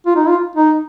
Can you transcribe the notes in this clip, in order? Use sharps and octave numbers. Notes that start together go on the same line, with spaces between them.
F4
D#4
F4
D#4